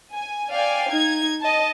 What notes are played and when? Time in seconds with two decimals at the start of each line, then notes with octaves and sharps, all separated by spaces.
0.14 G#5
0.52 D5 F5 G5 G#5
0.92 D#4 G#6
1.41 D#5 A5